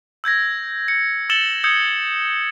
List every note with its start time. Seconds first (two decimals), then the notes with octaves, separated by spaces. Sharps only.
0.24 E6 G6 G#6 A#6
0.88 C#7
1.30 E6 A6 C#7 E7 F#7 G7
1.64 D#6 E6 G6 G#6 C#7